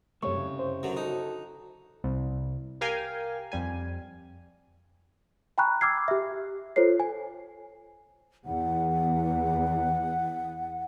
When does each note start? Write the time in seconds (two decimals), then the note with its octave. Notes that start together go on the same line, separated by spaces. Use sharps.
0.23 C2 F#2 A3 C#5 C#6
0.36 C#3
0.59 C5
0.83 F#2 D3 F#3
0.96 D#4 F#4 A4
2.04 C2
2.81 G4 A#4 F5 G5 G#5
3.52 F2 G3 G#5
5.58 G5 G#5 A#5 B5 C#6 F#6
5.81 D6 E6 F6 G#6 C7
6.08 G4 E5
6.76 F4 A4 C5 C#5 C7
7.00 G#5
8.45 E2 E3 F#5